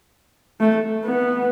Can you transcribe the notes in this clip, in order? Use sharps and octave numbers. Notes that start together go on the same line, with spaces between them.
A3
B3